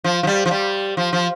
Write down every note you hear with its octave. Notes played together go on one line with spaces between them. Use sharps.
F3
F3
G3
F3
G3
F3
F3